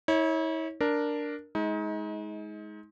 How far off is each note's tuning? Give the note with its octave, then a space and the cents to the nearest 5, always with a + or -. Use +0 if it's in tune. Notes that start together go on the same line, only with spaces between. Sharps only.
E4 -40 C#5 -5
D4 +0 A#4 +0
G#3 +20 D#4 +35